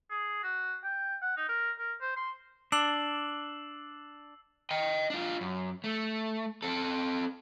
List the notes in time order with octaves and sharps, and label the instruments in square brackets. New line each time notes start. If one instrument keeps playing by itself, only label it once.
[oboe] G#4
F#4
G5
F#5
D#4
A#4
A#4
C5
C6
[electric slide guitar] D4 [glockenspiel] E6 C7 F#7
[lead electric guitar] D#5 G5
D4 F4
F#2
A3
C4 A4